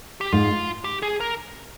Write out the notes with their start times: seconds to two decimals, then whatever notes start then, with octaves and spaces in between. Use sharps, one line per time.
0.21 G4
0.32 G#2 F4
0.84 G4
1.02 G#4
1.20 A#4